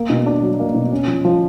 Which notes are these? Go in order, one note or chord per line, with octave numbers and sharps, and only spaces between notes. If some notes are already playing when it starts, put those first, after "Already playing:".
Already playing: A#3
B2
D4
F#3
A#3
B2
C#4
F3
F3